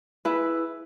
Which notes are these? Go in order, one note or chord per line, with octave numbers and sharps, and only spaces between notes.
E4 G#4 B4